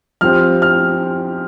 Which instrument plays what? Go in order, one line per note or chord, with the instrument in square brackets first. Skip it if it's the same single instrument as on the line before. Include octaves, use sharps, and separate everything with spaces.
[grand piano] F3 C4 G4 C5 [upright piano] F6
[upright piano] F6